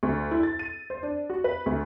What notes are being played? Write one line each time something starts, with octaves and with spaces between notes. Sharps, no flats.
D2
E4
A6
D#7
C5
D4
F#4
B4
D2